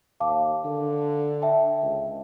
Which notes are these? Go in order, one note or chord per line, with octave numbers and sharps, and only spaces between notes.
D#2 F5 A5 D6
D3
E5 G5 A5
C#2